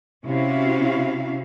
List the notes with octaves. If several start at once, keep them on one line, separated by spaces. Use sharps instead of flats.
C3 C#4 E4 F#4 F5